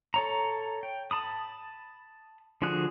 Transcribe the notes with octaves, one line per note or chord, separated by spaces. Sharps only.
A4 C#5 A#5
G5
A5 B5 D#6
D3 F3 F#4 G#4 F#6